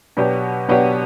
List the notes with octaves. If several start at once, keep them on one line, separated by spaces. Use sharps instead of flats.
B2 F#3 B3 D4 G4
B2 F#3 B3 D4 G4